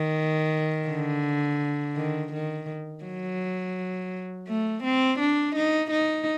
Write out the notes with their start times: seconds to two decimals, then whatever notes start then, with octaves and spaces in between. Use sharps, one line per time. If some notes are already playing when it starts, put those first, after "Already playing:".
Already playing: D#3
0.88 D3
1.96 D#3
2.33 D#3
3.04 F#3
4.48 A3
4.84 C4
5.20 D4
5.56 D#4
5.91 D#4